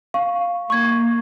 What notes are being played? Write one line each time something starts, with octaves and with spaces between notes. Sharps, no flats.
F5 C#6
A#3 C#6 G#6